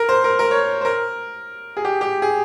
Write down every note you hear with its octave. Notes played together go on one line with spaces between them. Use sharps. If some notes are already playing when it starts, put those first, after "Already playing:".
Already playing: A#4
C5
A#4
A#4
C#5
C5
A#4
G#4
G4
G4
G#4